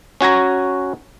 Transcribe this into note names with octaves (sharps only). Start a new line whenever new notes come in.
C#4 F#4 G#5 A#5